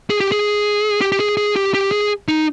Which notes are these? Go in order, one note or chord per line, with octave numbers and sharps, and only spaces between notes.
G#4
G4
G#4
G4
G4
G#4
G#4
G4
G4
G#4
D#4